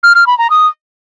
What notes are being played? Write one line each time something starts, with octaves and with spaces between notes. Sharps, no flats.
F6
F6
B5
A#5
D#6